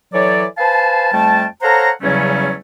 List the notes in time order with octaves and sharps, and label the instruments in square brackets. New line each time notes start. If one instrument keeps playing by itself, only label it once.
[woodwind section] E3 F#3 A4 C#5 D5
B4 C5 F5 G#5 A5
F2 G3 A3 G5 A5
A4 C5 C#5 F5 F#5 A#5
E2 C#3 F#3 G3 A3 C#4